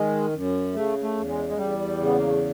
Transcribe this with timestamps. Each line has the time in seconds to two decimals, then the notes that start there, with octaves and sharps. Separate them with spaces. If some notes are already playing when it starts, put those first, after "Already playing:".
Already playing: D#3 G#3
0.34 F#2
0.74 C#3 A3
1.03 A3
1.16 E2
1.30 G#3
1.50 G#3
1.58 E2 G3
1.99 C#3
2.06 B3
2.18 A#3
2.28 A3